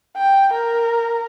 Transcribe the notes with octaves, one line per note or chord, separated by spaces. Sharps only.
G5
A#4